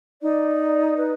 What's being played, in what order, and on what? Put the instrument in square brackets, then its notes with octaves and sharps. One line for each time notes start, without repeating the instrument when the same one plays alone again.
[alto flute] D#4 [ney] D5
[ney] B4